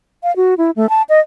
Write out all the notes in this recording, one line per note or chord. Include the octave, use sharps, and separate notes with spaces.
F5
F#4
E4
A3
A5
D#5